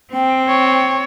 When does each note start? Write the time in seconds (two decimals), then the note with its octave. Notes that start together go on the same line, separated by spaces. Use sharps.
0.13 C4 G5
0.48 C#5